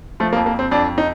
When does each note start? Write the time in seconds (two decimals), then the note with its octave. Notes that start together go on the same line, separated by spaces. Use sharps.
0.20 F3 A3
0.33 A#3
0.37 F2
0.46 A#3
0.54 F2 C4
0.71 F2 D4
0.89 F2
0.98 D#4